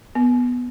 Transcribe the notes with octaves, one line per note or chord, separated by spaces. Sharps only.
B3